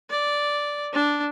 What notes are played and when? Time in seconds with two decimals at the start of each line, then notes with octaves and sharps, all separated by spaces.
0.10 D5
0.93 D4